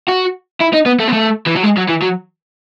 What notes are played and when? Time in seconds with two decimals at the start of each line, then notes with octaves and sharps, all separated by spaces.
0.09 F#4
0.61 E4
0.74 D#4
0.86 B3
0.99 A3
1.08 B3
1.13 A3
1.46 E3
1.56 F#3
1.63 G#3
1.77 F#3
1.88 E3
2.02 F#3